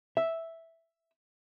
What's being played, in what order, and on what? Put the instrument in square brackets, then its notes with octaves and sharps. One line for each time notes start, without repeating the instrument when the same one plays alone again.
[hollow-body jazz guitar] E5